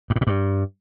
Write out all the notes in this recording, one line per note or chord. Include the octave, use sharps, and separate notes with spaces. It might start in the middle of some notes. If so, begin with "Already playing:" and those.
G2
A2
A#2
G2